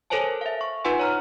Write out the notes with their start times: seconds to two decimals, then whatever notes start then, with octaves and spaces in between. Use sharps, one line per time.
0.10 A4 A#4 C5 C#5 G#5 A5
0.41 E5 F5
0.61 C#6
0.84 D#4 F4 B4 F#5 G#5 C6
0.99 C#5 A#5 F6